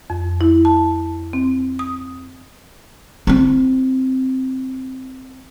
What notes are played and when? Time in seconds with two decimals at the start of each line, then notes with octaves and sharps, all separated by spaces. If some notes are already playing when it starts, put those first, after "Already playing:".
0.10 F2
0.41 E4
0.65 A5
1.33 C4
1.79 D#6
3.27 C4 E4